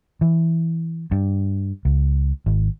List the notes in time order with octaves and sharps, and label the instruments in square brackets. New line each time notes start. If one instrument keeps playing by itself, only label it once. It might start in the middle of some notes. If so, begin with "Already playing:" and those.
[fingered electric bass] E3
G2
C#2
G#1